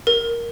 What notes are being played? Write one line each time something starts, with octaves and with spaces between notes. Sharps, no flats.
A#4